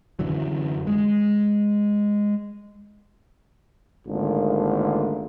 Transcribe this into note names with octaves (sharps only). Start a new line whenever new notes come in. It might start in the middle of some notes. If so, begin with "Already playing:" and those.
F#2 D3 E3 F#3
G#3
G#1 D3 A3 A#3 F4